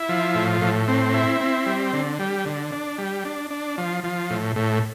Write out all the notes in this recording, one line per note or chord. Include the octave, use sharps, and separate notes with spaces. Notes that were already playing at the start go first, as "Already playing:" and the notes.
Already playing: E4
F3
A2
A2
C4
E4
C4
G3
D3
G3
D3
D4
G3
D4
D4
F3
F3
A2
A2